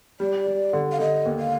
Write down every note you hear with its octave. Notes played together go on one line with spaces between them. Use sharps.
G3 D5
G3
D3
F5
D3 D#5
D#2
F5